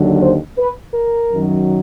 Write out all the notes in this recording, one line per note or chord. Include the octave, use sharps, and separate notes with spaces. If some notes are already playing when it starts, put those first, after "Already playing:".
Already playing: D#2 D3 F#3
C5
B4
A#4
F#2 D#3 F#3